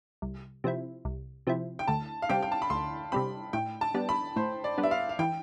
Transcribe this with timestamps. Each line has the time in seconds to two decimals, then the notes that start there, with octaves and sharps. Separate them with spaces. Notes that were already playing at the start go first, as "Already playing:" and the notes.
0.22 C2
0.64 C3 F3 C4 E4
1.05 C2
1.47 C3 F3 C4 E4
1.79 G5
1.88 D2 A5
2.22 F5
2.29 C3 G3 C4 G5
2.43 G5
2.52 A5
2.62 B5
2.70 D2 C6
3.12 C3 G3 C4 B5
3.53 A2 G5
3.81 A5
3.94 G3 B3 D4
4.09 B5
4.36 A2 C5
4.64 D5
4.78 G3 B3 D4
4.83 E5
4.91 F5
5.09 F5
5.19 E3 G5